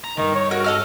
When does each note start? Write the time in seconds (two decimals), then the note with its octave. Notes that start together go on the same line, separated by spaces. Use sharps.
0.04 A#5
0.18 D2 G2 D#3
0.35 C#5
0.51 F#4 A#4
0.64 A4 D#5 F6